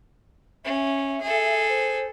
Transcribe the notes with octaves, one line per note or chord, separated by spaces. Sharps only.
C#4 E5
G#4 A4
C5